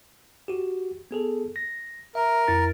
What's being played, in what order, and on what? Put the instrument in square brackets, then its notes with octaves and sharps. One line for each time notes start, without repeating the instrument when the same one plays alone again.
[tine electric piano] F#4 G4
B3 G#4 A4
A#6
[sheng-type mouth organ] A#4 [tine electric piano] E5
[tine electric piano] F2 E4 A6